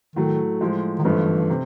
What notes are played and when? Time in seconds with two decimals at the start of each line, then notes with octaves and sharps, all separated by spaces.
0.16 A2 D#3 F#3 A3
0.61 A2 F3 G#3
0.98 D#3
1.04 G#1 G2 D3 E3 F3 A3
1.50 C3